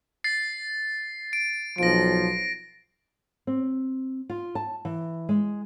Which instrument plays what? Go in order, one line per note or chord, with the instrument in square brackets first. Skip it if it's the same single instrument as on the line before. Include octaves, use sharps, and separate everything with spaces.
[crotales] A6 C7
D7
[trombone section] B1 F3 [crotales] A#6 D7
[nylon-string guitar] C4
F4
A5
E3
G#3